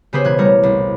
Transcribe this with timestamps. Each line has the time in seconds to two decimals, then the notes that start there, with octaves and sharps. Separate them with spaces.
0.13 C#3 B3 G4 G#4 B4 C5
0.25 E1 F#6 G#6
0.38 G3 A3 A#4 C#5
0.63 C2